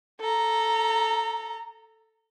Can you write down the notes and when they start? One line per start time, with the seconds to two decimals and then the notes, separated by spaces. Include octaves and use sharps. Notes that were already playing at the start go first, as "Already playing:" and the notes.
0.21 A4 A#5